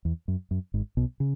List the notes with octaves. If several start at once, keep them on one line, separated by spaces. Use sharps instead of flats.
E2
F#2
F#2
G#1 G#2
B1 B2
C#3